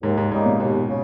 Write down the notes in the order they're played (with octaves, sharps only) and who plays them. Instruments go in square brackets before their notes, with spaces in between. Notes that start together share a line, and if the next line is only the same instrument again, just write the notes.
[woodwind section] D#2 [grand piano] G#2
[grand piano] G#2
[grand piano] G#2 [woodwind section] C#3 G3 A#3 D#4
[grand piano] A#2
[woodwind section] D#2 [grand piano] B2
[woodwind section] C#3